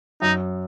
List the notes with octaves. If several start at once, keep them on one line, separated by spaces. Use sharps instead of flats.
F#2 D#4